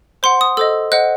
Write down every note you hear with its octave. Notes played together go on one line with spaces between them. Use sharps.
C5 F#5 C6
D#6
A4 C5 D#5 E6
C5 D#5 F#5 F#6